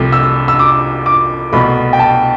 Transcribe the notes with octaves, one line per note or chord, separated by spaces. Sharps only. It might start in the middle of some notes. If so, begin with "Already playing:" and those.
Already playing: C2 C3 F3 A3
E6
E6
D6
D6
C2 B2 A3 B5
G5
A5